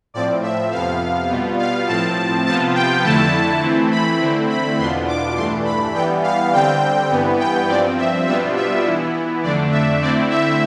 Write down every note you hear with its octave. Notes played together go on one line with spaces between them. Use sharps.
A2 F3 C4 D5
E5
F2 C3 F3 B3 F5
B2 G3 B3 F4
F5
A2 F3 C4 A5
C3 F3 B3 F4 A5
G5
F2 D3 A3 E4 A5
E3 A3 C4 E4
B5
D3 A3 C4 E4
B5
E2 B2 B3 D4 F4 C6
D6
G2 E3 A3 D4 C6
B5
E3 G3 B3 G5
F5
D3 G3 C4 G5
G2 E3 B3
G5
G2 F3 C4 D5
E5
B2 G3 B3 D4 F4 E5
E5
E3 B3 E4
F2 D3 A3 D4 D5
E5
D3 A3 C4 E4 D5
E5